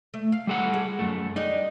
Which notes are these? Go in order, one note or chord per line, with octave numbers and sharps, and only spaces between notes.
A3
F5
G3 A4 F#5
G#4
F#2 A3
G3 D4 D#4